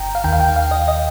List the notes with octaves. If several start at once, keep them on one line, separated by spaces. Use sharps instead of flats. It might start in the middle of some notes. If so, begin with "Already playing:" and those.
Already playing: G1 G5 A#5
F5
D#2 D#3 G5
F5
G5
F5
D#5
D#5